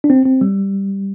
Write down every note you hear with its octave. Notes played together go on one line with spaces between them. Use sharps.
D4
C4
C4
G3